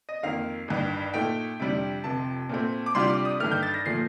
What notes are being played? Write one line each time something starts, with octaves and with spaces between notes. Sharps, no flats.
D#5
F2 D#3 A#3 F5
A1 G2 D#3
A#2 A3 D#4 G5
F2 C3 G3 D4
F1 F2 C3 A5
A#2 A3 C4
D6
C2 C3 G3 D4 F4 C6
D6
D#6
G2 D#3 A3 F6
G6
A6
A#6
A#2 F3 A3 C7